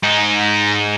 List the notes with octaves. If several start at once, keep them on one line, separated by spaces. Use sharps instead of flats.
G#2 D#4